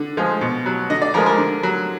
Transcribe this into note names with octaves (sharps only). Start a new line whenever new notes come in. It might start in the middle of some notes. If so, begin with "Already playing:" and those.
Already playing: D3
F3 G#3
B2
F#3
D3 D#5
D5
F3 G#3 A#4
A#4
D3
F#3